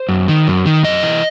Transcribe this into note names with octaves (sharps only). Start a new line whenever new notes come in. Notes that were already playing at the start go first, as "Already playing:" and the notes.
Already playing: C5
F#2
D#3
F#2
D#3
F#2 D#5
E3